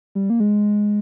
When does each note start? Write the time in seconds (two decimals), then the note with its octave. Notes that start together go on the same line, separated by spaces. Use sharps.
0.15 G3
0.30 A#3
0.40 G#3